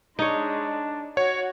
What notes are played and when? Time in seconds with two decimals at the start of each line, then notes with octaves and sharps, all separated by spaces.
0.19 G#3 D4 D#4 C#5
1.17 F#4 C#5